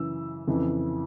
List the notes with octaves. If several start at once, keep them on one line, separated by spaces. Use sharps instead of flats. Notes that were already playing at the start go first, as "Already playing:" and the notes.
Already playing: F#2 C#3 E3 E6
F2 C#3 E3